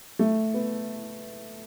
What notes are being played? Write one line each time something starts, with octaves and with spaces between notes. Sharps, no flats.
A3
B3